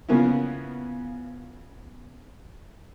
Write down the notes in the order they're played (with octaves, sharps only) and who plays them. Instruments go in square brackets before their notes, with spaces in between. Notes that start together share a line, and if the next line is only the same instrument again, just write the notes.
[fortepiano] C#3 F3 A#3 B3 C#4 E4